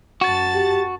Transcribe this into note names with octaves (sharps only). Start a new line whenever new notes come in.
F#2 F#4 A5 A6
G4